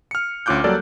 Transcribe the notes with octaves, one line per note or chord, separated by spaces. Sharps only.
F6 C#7
D2 C#4 F4 D6 F#6 G6
F#3 G3 A#3 A4 D5